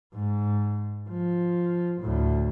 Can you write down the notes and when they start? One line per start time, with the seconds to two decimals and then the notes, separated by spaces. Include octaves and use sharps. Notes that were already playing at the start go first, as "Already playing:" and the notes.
0.14 G#2
1.09 F3
2.01 D2 A2